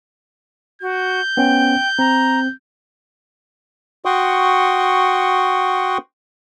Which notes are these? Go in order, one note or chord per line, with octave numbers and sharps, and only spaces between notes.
F#4 G6
B3 C#4 G5
C4 A#5
F#4 F#5 G5 C6 C#6 D#6